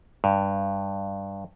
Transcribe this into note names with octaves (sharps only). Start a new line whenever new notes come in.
G2